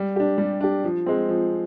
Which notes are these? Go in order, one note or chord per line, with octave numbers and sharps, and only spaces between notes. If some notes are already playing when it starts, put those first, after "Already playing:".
Already playing: G3
D4 G4
G3
D4 G4
F3
G#3 C4
F3